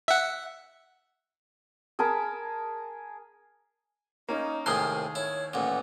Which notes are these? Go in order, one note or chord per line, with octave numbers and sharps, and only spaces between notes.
E5 F#5
G#4 A#4 A5 B5
A#3 C#4 D#4
D#2 A2 C3 G#4 A#4 C6 D#6
E4 C#5
A1 A#2 F#5